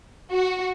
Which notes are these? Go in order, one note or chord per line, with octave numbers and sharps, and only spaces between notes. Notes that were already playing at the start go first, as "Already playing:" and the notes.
F#4